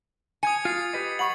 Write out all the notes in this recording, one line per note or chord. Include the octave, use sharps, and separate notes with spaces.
G#5 D#6 G#6 C#7
F4 A6 C7
G4 B4 D#5
F#5 B5 C#6 F#7